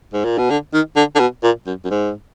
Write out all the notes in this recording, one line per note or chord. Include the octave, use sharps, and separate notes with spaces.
G#2
A#2
B2
D3
D#3
D3
D3
B2
A#2
F#2
F#2
G#2